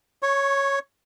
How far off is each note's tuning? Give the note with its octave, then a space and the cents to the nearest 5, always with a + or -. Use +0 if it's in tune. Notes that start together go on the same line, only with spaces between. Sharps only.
C#5 +0 C#6 -25